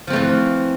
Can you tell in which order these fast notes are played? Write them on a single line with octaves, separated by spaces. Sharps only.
F3 C4 A3 E3